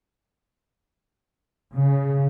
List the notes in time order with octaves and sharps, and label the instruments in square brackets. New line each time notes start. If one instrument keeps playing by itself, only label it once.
[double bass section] C#3